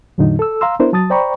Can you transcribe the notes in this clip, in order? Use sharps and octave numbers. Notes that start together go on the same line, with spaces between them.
E2 A2 D3 F#3 D#4
A4 E6
F5 A#5 C6 E6
B3 D4 E4 A#4 C5
F#3 A5 D#6 A6
C5 D5 G5 A#5 B5 C#6